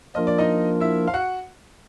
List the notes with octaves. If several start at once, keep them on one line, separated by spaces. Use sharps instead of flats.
F3 A#3 D4 F4 A#4 D#5
D5
D#4 D#5
E4 E5
F5
F#4 F#5